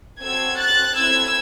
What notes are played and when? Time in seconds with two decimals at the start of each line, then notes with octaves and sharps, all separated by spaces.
0.21 C4 F#4 A4 E6 G#6
0.58 F#6 A6
0.96 C4 E4 A4 E6 G#6